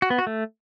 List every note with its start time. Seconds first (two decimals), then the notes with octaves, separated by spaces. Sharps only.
0.02 F#4
0.10 B3
0.19 F#4
0.27 A3